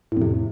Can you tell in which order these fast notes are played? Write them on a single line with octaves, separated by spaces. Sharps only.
A2 F2 C3